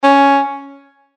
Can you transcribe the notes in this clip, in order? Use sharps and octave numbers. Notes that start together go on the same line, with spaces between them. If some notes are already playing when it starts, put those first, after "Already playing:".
C#4